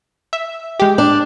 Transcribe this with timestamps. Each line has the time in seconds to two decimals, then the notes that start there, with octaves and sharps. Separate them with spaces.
0.33 E5
0.80 G#3 G4
0.98 D4